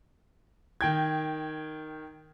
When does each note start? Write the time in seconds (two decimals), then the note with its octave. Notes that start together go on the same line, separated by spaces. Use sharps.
0.81 D#3 G5 G#6